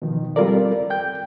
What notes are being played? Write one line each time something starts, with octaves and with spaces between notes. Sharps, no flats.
B2 D#3 F3
G3 C4 F4 A4 A#4 D5
G5 G6